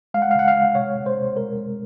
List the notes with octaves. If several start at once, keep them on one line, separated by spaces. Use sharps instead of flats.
G#3 F5
F#5
F5
C#3 F#5
F5
G#3
C3 C#5
C3
C5
C3
G#3 A#4
G#3